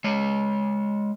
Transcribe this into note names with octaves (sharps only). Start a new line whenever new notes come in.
G#3 C#5